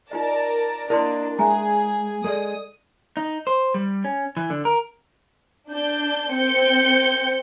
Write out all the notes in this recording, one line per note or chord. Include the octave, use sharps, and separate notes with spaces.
D#4 F4 A#4 D5 D#5 A5
A#3 D4 E4 A#4 D5 D#5 A#5 C6
G#3 G#4 E5 G#5 A#5
G#3 G#4 A4 D5 D#5 D#6
D#4
C5
G3
C#4
E3
D3
A#4
D4 G6
C4 G6 C#7